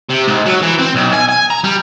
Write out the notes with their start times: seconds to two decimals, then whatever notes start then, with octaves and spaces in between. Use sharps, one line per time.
0.10 C3
0.28 G#2
0.46 F#3
0.62 E3
0.79 C4
0.96 B1
1.13 G#5
1.29 G#5
1.50 A#5
1.64 G3